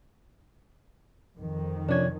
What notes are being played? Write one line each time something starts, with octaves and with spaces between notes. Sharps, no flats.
F2 D#3
C3 F3 C#4 D4 G#6